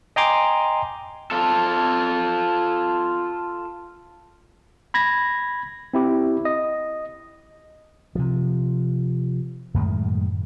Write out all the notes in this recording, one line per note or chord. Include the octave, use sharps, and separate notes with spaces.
D#5 G5 G#5 A#5 C6 D6
F4 A4
B5 G#6 A#6
C4 E4 G4
D#5
C3 F3
F#2 A2 D#3 G#3